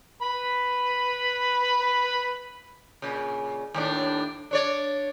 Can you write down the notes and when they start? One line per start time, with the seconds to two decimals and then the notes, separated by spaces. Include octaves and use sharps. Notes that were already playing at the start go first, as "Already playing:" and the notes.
0.22 B4 B5
3.02 A#2 C#3
3.74 D#2 A2 D4
4.51 D4 C#5 D5